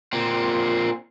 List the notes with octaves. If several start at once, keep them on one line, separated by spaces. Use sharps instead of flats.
A#2 C4